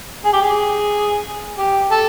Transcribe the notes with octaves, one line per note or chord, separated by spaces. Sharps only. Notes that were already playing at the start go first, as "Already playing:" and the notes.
G#4
G4
G#4
G4
A4